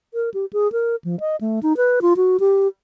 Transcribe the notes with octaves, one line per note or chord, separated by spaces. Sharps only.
A#4
G4
G#4
A#4
F3
D#5
A3
D#4
B4
F4
F#4
G4